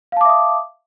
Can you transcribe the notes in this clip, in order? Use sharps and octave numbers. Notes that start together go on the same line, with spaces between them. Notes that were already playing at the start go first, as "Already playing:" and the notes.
E5 F5 A5 D6 D#6